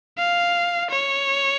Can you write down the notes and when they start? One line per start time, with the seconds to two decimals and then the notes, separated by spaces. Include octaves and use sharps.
0.18 F5
0.91 C#5